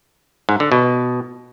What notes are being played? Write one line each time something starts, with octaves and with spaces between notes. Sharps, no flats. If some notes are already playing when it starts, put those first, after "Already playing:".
G#2
D3
B2